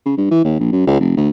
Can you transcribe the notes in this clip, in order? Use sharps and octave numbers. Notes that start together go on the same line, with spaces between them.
C#3
G2
E3
D#2
A#1
F#2
C#2
F1
D2